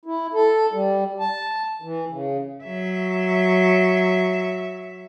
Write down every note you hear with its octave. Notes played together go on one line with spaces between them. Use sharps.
E4
A4
G3
A5
E3
C#3
F#3 E5